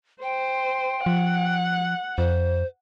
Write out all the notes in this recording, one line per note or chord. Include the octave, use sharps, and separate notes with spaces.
C5 G5
F3 F#5
F2 C5